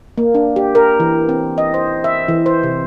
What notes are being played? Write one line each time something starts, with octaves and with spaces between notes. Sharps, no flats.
A#3
D4
G4
A#4
E3
C4
D#5
C5
E5
E3
C5
C3